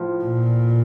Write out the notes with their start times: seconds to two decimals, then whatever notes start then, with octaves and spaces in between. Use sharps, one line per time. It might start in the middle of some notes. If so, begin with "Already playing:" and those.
Already playing: A2 F3
0.24 A#2